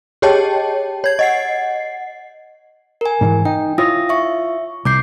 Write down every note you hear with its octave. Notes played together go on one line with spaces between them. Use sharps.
G4 G#4 C#5 D#5 G5 A5
C#5 G#6
D#5 F#5 C7
A#4 G#5
G#2 C#3 E3
D#4 G5
E4 F4 C#5 D#6 A#6
E5 C#6
C2 D6 G6 C7